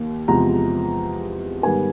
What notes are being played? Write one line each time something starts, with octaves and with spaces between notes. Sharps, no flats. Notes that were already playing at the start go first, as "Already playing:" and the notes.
Already playing: D#2
E2 C3 F3 G#3 A#5
G#2 D#3 G3 B3 G#5